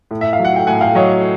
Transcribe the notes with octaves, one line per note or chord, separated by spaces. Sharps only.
A2
E5
F5
F#3
F#5
G5
A2 F#5 G#5
F5 G5
F#3 C#5 D#5